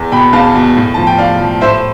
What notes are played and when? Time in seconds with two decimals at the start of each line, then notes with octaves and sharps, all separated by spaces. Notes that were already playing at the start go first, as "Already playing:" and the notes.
Already playing: E2
0.12 B2 G5 B5
0.33 E2 F5 A5
0.55 B2
0.76 A2
0.94 F3 A5
1.07 G5
1.18 A2 D5 F5
1.40 F3
1.61 A2 C5 E5